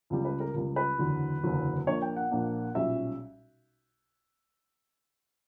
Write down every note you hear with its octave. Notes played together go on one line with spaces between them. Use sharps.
C#2 C#3 G3
B4
A#4
C#2 C#3 G3
B4
F#1 E2 D3 F#3
F#1 E2 D3 F#3
A#1 A#2 A#3 D4 C#5
G5
F#5
A#1 A#2 A#3 D4
B1 A#2 G3 C#4 E5